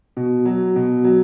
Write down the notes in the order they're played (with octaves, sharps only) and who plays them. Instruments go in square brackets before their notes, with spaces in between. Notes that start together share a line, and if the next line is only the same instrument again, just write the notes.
[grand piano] B2
F#3
B2
F#3